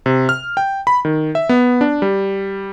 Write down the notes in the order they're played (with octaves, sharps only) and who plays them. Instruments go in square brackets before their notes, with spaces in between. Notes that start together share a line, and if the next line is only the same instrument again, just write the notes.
[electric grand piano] C3
F6
G5
B5
D#3
E5
B3
D4
G3